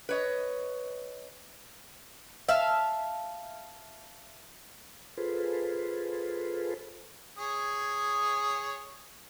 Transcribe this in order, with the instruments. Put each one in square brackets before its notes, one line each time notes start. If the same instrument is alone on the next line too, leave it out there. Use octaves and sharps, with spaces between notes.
[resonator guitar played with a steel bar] B4 C#5 D#5
[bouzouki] E5 F5 A5
[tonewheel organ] F4 G#4 A4 B4 C5
[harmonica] G#4 C#5 D#6